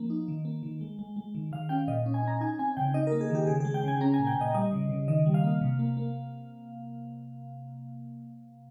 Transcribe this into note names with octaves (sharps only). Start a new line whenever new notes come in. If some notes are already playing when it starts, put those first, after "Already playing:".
Already playing: F3 A#3
D#4
D#3
A#3
D#3
G#3
G#3
G#3
D#3
D#3 F5
C#4 G5
A#2 D#5
C#4
G#5
C#4 A#5
D#4 G#5
C4 G#5
C#3 G5
D#4 D#5
A#4
A#3
G#4
D#3 G4
C#3 G#4
G#3 G#4
G5
C#3 G#5
C#4 A#5
G#5
A#2
G5
A#2
D#5
G3 D#5
C#3
C#3
D#3 D#5
G3
F5
A#3
C3
A#3
A#3